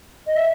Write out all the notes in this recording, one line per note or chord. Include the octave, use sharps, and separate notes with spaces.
D#5
E5